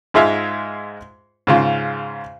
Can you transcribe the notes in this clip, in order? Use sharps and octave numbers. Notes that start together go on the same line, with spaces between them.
G#2 G#3 F4 E5 F5
G#2 C#3 F4